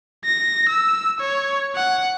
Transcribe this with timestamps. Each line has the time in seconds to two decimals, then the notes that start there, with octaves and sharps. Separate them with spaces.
0.25 A#6
0.69 E6
1.20 C#5
1.76 F#5